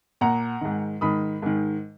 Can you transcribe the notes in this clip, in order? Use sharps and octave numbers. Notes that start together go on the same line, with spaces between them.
A#2 F#5 A#5
G#2 D#3
G#2 D#3 B5 D#6
G#2 D#3